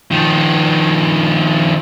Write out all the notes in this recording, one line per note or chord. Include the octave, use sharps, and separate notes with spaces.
D#3 F3